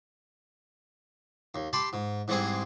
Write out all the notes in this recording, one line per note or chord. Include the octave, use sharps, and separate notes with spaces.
D#2
G4 A5 B5 C6
G#2
G#2 E3 G3 C4 G#4